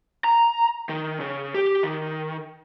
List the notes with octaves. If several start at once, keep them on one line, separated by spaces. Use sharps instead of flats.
A#5
D#3
C#3
G4
D#3